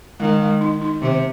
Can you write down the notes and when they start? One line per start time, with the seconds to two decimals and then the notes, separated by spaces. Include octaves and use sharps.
0.20 D#3 G#3
0.40 G#3
0.61 D#4
0.82 D#4
1.01 C3 D#3